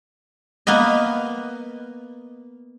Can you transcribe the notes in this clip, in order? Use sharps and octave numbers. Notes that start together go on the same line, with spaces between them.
A#3 B3 B4 D#5